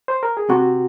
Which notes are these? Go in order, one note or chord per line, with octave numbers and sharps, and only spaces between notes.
C5
A#4
G#4
C3 F#4